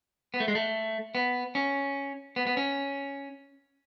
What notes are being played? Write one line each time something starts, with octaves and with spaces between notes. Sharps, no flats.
B3
A3
G#3
A3
B3
C#4
B3
B3
C#4